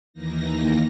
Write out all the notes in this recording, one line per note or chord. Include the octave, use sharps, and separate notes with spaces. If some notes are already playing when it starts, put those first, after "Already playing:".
D#2 D#3 E3 A#3 D#4 A#6